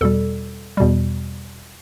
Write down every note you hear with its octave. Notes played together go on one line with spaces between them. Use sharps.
E2 B2 G3 A4
E2 B2 G3